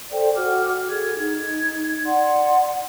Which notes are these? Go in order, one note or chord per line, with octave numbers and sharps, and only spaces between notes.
A4 C5 D5 G5
F#4 D6 F6
G#4 A4 G#6
D#4 G#6
D5 F#5 C6